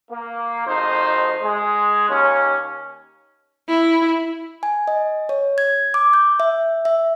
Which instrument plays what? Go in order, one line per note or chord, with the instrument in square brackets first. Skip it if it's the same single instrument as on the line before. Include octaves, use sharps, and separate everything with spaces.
[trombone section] A#3
G#1 F2 D#4 C5
G#3
D#2 C#4
[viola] E4
[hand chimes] G#5
D#5
C#5
G#6
D6
G6
E5
E5